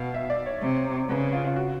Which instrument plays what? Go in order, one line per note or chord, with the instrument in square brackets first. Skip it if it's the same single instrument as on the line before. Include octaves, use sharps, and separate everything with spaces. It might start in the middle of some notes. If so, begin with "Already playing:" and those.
Already playing: [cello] B2 [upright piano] F5
[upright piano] E5
D5
C#5
[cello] C3
[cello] C#3 [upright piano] B4
[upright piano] F4
F4
F#4